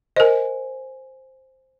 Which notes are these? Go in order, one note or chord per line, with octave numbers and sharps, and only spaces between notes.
A#4 C5 D#5 G#5